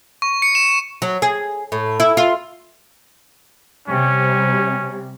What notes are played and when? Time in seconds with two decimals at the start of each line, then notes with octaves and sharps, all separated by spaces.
0.22 C#6
0.42 C#7
0.55 E7
1.02 F#3
1.22 G#4
1.72 A2
2.00 E4
2.17 F4
3.88 C3 G3 C#4